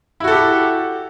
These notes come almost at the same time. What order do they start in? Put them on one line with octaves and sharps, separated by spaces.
E4 F#4 A4 G4